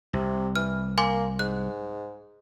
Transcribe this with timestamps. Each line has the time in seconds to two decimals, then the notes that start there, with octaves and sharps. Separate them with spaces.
0.13 C2 C3
0.56 E3 F6
0.98 A#3 G#5 C6 D6
1.39 G#2 F#6